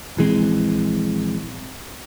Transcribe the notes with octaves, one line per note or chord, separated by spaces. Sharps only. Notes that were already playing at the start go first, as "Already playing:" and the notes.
A#1 E3 G#3 C4